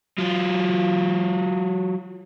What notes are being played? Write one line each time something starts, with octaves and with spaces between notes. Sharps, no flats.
F#3 F4